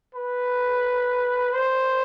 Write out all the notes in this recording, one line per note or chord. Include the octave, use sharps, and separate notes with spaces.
B4
C5